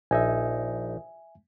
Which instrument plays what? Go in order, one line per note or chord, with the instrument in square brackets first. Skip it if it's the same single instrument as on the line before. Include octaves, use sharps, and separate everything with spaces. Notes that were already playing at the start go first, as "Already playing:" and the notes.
[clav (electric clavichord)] A#1 D#4 [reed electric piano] E5 G#5